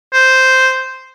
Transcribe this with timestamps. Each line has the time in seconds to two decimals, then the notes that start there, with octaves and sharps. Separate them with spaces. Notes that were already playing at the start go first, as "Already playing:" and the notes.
0.13 C5